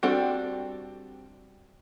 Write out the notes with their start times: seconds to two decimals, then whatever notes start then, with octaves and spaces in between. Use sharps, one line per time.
0.03 G3 C4 D4 F#4 A4